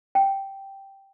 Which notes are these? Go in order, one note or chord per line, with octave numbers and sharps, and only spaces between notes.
G5